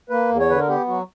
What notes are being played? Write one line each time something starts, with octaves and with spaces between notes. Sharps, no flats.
A#3 B4
E2
C#5
D3 B4
A#4
B3 G4
F#3 F#4